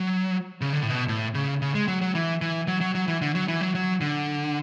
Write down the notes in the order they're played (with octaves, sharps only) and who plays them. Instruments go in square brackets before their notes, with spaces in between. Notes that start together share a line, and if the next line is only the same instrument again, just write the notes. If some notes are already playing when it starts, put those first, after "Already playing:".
Already playing: [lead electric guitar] F#3
C#3
D3
A2
B2
A2
C#3
C#3
G#3
F#3
F#3
E3
E3
F#3
F#3
F#3
E3
D3
F#3
E3
F#3
F#3
D3